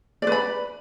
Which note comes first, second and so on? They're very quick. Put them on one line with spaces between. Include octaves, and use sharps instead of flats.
D5 B4 B5